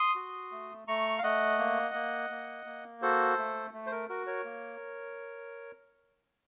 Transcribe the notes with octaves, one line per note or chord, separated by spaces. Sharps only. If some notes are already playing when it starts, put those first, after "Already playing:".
Already playing: C6 D#6
F#4
A3
A3 A#5 C#6
F5
A3 D#5 F#5
A#3
A#3
A#3
A#3
F#4 A4 C5
A3
A3
C5
A#4
F#4 A#4
A#4 C#5
A#3